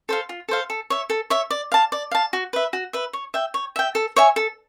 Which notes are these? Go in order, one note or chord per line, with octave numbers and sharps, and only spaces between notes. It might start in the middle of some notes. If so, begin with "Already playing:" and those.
A4 C5 F5
F4
A4 C5 F5
A4
C#5 E5
A4
C#5 E5
D5
F5 A5
D5
F5 A5
F#4
B4 E5
F#4
B4 E5
C#5
E5 G5
C#5
E5 G5
A4
C#5 E5 G#5
A4